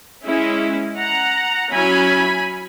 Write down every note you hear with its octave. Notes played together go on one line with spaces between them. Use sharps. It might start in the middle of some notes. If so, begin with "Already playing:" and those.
G#3 C#4 E4
F#5 A#5
F#3 C#4 E4 G#5 B5